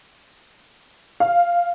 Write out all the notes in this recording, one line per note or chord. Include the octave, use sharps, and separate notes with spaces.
F5